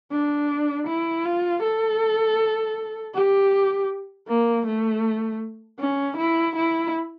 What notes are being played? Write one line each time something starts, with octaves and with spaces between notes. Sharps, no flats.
D4
E4
F4
A4
G4
A#3
A3
C#4
E4
E4